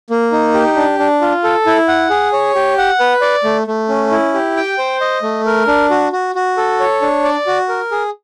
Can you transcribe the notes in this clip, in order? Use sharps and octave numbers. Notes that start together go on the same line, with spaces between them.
A#3
D#4
G4
D4
D4
F4
A4
E4
F#5
G#4
C#5
G4
F#5
B4
D5
A3
A3
C#4
E4
G4
G5
C5
D#5
A3
A#4
D4
F#4
F#4
F#4
A4
C#5
D4
D5
F#4
A#4
G#4